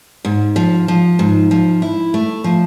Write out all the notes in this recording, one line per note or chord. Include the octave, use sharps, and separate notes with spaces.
G#2
F3
F3
G#2
F3
E4
A3
F3